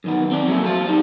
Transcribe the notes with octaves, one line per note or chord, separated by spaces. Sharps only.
F#2 D#3 B3
C4 D5
F#3 A3 A#3 E4
C5 D5 F5 A5
G3 D#4